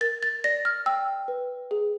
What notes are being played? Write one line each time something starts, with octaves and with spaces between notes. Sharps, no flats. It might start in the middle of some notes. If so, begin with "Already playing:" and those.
A#4 A6
A6
D5 A#6
F6
G5 E6
B4
G#4